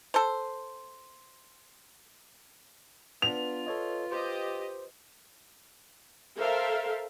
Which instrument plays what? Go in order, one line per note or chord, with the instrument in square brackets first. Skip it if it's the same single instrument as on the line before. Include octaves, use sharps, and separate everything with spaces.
[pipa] A4 C5
[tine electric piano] B3 D4 [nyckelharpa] F4 B4 [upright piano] F7
[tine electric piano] A4 C#5 D#5
[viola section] G4 D#5 [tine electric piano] C5
[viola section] A4 A#4 C5 E5 F5